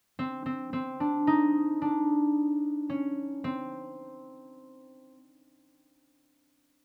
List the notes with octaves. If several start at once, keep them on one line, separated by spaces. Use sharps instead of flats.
C4
C4
C4
D4
D#4
D4
C#4
C4